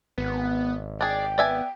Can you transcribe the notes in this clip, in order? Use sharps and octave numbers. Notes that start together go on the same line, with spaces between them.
G#1 B3
D4 G#4 D5 G5
B3 D5 E5 G#5